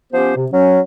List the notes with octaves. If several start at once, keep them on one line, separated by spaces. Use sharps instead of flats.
F3 B3 C#4 G4 C5
C3
F#3 C#4